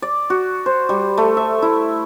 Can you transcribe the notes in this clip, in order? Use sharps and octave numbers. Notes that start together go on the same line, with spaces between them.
D5
F#4
C5
G3
A3
E5
E4